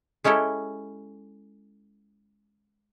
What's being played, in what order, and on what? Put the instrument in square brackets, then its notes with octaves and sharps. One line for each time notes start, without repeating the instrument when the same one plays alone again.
[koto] G#3 C#4 E4 G4 A4